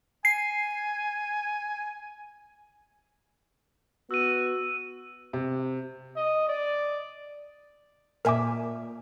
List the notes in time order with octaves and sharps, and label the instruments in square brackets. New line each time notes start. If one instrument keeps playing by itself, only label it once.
[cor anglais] G#5 [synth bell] C7
[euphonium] B3 [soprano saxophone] F#4 [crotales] E6 D#7
[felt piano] C3
[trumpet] D#5
D5
[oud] A#2 E5 [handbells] A#4 G#5 D6